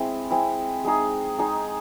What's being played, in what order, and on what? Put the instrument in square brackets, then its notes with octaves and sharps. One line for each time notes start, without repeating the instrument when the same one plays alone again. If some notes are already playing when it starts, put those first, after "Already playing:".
Already playing: [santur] G#3 C4 E4
G#3 C4 E4
G#3 D#4 G#4
G#3 D#4 G#4